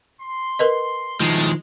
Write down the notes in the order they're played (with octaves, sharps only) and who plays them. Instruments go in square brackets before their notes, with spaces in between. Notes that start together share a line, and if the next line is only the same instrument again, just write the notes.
[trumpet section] C6
[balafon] A#4 B4 D#5
[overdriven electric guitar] D#3 F3 [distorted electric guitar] G#3 [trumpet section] A3 A5